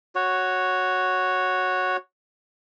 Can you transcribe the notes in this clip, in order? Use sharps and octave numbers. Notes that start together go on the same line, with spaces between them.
F#4 C#5